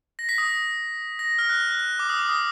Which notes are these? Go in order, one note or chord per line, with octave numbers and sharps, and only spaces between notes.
A#6
B6
D#6
A#6
F6
F#6
F#6
F#6
D6
D#6
D6
D#6